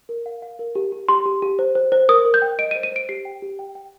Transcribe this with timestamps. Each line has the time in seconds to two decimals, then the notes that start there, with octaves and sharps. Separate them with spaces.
0.09 A#4
0.26 F5
0.42 F5
0.59 A#4
0.75 G4
0.92 G4
1.09 G4 C6
1.26 G4
1.42 G4
1.59 C5
1.75 C5
1.92 C5
2.09 A#4 D#6
2.25 A#4
2.34 G6
2.42 G5
2.59 D#5 D7
2.71 D#7
2.75 C5
2.83 D#7
2.92 C5 D7
3.09 G4 C7
3.25 G5
3.42 G4
3.59 G5
3.75 G5